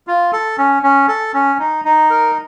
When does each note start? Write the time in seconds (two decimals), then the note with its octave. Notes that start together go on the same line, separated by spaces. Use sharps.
0.07 F4
0.33 A4
0.58 C#4
0.83 C#4
1.08 A4
1.34 C#4
1.59 D#4
1.85 D#4
2.10 A#4